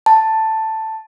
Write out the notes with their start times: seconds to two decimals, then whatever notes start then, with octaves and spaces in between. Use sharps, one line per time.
0.06 A5